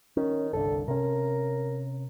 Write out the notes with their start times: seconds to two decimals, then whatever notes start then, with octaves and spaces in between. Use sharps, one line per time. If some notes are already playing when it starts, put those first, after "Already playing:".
0.17 D#3 C#4
0.53 G1 C2 D3 A4
0.88 C3 C#4 A#4